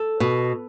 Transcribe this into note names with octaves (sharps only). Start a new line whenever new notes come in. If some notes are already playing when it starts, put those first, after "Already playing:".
Already playing: A4
B2